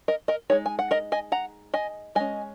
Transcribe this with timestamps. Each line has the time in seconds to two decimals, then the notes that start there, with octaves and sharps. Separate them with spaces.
0.08 A#4 D#5
0.28 A#4 D#5
0.50 G#3 D#4 G#4 C#5
0.66 G#5
0.79 F#5
0.91 A#4 D#5
1.12 D#5 G#5
1.32 F#5 A#5
1.74 D#5 G#5
2.15 G#3 C#4 D#5 G#5